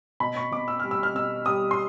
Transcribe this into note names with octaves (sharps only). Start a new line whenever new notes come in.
B2 B5
C#6
B2 D6
E6
G3 F6
E6
F6
B2 E6
G3 D#6
C6